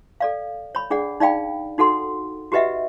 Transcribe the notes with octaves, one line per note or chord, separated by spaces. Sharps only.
A4 D5 F5
C#5 B5
D4 G#4 D5 F#5
D#4 D5 F5 G5 B5
D#4 F#4 A4 F#5 C6
F#4 G4 B4 D#5 E5 F#5